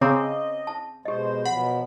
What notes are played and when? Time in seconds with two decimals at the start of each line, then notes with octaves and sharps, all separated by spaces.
0.01 C#3 C4 D#5 A#5 D6
0.67 A5
1.05 B2 G#3 G4 C5 D#5
1.45 B2 F3 F#3 F#5 B5